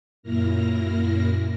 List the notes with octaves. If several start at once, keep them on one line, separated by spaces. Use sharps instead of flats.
F#2 A#2 A#3 E4 F6 A#6